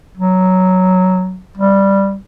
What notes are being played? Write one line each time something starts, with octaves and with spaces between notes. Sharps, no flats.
F#3
G3